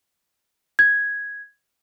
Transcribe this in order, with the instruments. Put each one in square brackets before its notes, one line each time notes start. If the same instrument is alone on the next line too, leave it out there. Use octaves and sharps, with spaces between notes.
[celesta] G#6